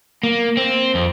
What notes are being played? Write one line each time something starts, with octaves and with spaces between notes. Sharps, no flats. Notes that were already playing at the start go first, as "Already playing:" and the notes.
A#3
C4
F2